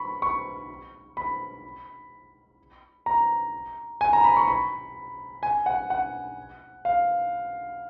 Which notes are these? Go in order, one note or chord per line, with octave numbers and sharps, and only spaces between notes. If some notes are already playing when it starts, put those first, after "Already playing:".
Already playing: B5 C#6
C#6
B5
A#5
G#5
A#5
B5
C#6
B5
G#5
F#5
F#5
F5